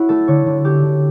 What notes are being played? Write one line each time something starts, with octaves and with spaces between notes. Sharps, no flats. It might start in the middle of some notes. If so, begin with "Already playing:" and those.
Already playing: C#4 E4 F#4
A3 A4
D3 C#5
D3
C#4 G4
D3